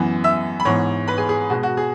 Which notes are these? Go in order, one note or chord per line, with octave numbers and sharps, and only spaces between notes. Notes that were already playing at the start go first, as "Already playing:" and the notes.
Already playing: F#2 E3 B3
E5 E6
B5
G#2 E3 B3 C#5 C#6
B4 B5
G#4 G#5
G#4
B2 G#3 B3 F#4
F#4
G#4